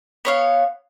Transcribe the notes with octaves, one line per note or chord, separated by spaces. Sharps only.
B3 C#5 F5